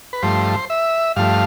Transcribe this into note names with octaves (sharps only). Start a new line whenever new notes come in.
B4
G2 F3 A3 C5
E5
G2 F3 A3 F5